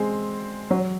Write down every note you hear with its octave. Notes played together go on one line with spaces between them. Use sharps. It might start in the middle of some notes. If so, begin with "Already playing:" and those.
Already playing: G#3 C4
F#3